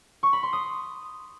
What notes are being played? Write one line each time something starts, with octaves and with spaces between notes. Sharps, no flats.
C#6
B5
C6
D#6